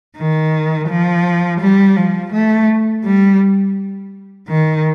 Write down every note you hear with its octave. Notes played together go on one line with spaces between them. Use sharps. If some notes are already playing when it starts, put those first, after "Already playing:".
D#3
F3
G3
F3
A3
G3
D#3